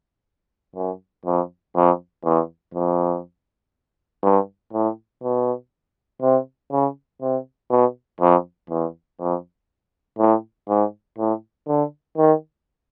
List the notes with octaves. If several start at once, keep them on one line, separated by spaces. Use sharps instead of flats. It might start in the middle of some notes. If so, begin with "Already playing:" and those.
F#2
F2
F2
E2
F2
G2
A2
B2
C3
C#3
C3
B2
F2
E2
F2
A2
G#2
A2
D3
D#3